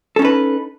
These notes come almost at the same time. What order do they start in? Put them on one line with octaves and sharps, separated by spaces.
A4 C#4 D#4 B4